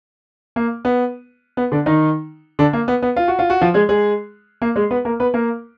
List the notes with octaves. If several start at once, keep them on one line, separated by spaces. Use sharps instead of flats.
A#3
B3
B3
D3 D4
D#3 D#4
D3 D4
A#3
B3
B3
F4
F#4
F4
F#4
F3 F4
G#3 G#4
G#3 G#4
A#3
G#3 G#4
B3 B4
A#3 A#4
B3 B4
A#3 A#4